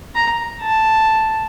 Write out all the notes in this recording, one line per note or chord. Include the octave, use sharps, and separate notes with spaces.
A#5
A5